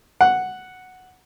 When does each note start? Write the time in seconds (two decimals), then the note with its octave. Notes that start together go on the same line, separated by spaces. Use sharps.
0.21 F#5